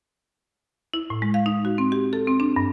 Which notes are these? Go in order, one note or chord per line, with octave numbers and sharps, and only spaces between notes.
E4
A2
G#3
F5
D#4
F#4
C4
G4
A4
C4
D4
G2